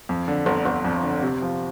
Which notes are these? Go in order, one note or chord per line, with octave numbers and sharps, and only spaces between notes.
F2
D3
G1
G1
F2
D3
C3
F3